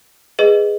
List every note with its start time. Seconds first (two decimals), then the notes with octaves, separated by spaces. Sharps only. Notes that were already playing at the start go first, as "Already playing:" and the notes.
0.39 G#4 B4 D#5